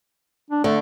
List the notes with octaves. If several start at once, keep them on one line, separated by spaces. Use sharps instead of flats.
D4
D3 A3